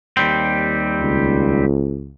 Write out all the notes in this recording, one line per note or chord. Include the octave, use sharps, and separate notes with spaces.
D#2 G3 C4
C#2